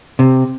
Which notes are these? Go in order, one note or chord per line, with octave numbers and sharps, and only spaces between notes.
C3